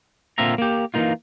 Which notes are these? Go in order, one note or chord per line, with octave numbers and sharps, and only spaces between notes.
A#2 D3 C4 F4 E5 A#5
A#3 G4
E3 F3 A#3 D#4 F4